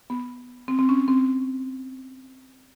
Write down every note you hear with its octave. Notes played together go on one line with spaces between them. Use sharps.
B3
C4
C4
C#4
C4